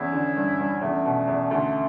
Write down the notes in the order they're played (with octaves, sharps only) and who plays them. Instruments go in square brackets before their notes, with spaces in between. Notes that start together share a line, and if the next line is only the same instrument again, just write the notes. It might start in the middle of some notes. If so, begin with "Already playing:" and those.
Already playing: [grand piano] E2 [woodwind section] C#4 E4
[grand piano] D3
G2
G2
[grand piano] E2 [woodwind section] A3 C#4
[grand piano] B2
E2
D2